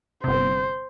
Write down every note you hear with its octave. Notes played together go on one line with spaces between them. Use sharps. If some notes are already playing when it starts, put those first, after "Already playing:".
G1 C3 C5